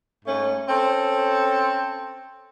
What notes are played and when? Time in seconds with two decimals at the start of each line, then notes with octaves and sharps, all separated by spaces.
0.25 G#2 A3 C#4
0.69 C4 C#4 A4